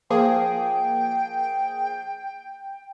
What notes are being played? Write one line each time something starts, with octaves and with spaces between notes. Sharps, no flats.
F3 A#3 G#4 G5